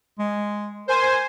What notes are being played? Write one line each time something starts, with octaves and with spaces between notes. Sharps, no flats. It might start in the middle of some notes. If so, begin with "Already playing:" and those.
G#3
A#4 C5 G#5